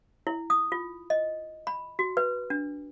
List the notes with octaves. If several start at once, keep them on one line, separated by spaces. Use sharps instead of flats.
E4
D#6
F4
D#5
B5
F#4
B4
D4